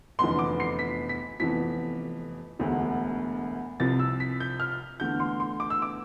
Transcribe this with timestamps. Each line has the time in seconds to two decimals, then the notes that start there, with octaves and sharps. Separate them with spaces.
0.19 F1 E2 D3 F3 B3 C6
0.39 D6
0.60 C7
0.79 B6
1.09 B6
1.40 F1 F2 E3 B3 B6
2.59 E1 D2 D3
3.80 C2 C3 F3 A6
3.99 E6
4.20 B6
4.40 G6
4.60 F6
5.00 E2 D3 A3 G6
5.20 C6
5.40 C6
5.60 D6
5.70 E6
5.82 D6